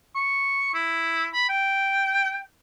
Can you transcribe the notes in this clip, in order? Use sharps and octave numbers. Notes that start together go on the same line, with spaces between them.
C#6
E4
B5
G5